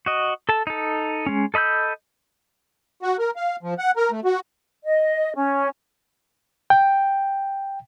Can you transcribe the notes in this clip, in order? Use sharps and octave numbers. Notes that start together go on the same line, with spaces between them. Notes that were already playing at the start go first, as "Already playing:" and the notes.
F#4 D#5
A4 A5
D#4 A4
G#3 C#4
A4 D#5 B5 E6 G6
F#4
A#4
F5
F3
F#5
A#4
A3
F#4
D#5
C#4
G5